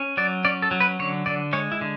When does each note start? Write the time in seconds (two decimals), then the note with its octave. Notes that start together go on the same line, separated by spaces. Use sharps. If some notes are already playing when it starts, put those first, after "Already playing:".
Already playing: C#4
0.17 F#3 D5
0.45 C#4 D5
0.62 A4
0.71 F#3
0.80 B4
0.99 D3 C#5
1.26 D3 D5
1.53 G#3 C#5
1.72 E4
1.81 D3